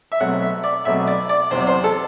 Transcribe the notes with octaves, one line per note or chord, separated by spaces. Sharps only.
E5
B1 B2 F#3 A3 C4 F#5
E5
D5
B1 B2 F#3 A3 C4 E5
D5
D5
E2 C3 F#3 C5
D5
C5
A4